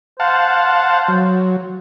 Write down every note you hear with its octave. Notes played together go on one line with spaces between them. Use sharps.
C5 F5 F#5 A5
F#3